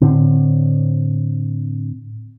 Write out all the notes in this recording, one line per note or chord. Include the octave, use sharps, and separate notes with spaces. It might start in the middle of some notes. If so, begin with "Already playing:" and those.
A2 D3 C4